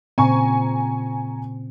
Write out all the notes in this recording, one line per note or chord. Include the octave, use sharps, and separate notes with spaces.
A#2 C#3 C4 G#5 A#5 C#6